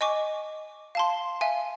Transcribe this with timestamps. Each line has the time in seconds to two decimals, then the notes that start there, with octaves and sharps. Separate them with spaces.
0.01 D#5 G#5 C#6 D6
0.95 F5 A5 C6
1.41 E5 F5 G#5